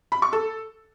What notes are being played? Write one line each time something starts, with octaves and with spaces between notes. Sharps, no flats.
B5
C#6
A4